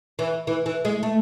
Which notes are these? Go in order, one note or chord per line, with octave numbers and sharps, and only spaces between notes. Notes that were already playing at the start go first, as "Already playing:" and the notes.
E3
E3
E3
G#3
A3